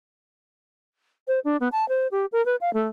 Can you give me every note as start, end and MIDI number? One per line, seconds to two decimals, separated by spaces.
1.28 1.39 72
1.44 1.57 62
1.60 1.68 59
1.72 1.88 81
1.89 2.07 72
2.11 2.26 67
2.32 2.44 70
2.45 2.56 71
2.61 2.73 77
2.73 2.88 57